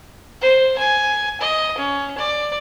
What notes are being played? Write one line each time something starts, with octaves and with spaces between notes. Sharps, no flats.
C5
G#5
D#5
C#4
D5